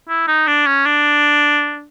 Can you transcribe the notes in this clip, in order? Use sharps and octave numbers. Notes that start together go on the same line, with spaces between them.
E4
D#4
D4
C#4
D4